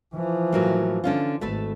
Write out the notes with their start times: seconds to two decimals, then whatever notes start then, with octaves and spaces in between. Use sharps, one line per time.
0.15 E3 F3
0.53 A2 F#3 A#3
1.04 D3 C#4 F4
1.41 G#1 A3 A4 B4